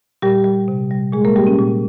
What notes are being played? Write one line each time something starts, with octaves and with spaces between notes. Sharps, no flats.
A#2 G3 G4
G3
C3
G3
A#2 G#3 G#4
A#3 A#4
G3 G4
C#4
A#2